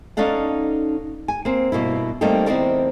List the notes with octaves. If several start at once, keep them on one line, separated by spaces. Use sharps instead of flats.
C#4 D#4 A4 D5 F5 F#5
G#5
A#3 C4
G2 B2 A#3 E4
G3 A3 A#3 C4 D#4 G4
E2 G2 C4 D#4 A#4 D5